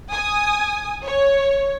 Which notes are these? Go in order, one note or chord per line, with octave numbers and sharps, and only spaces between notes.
G#5 D#6
C#5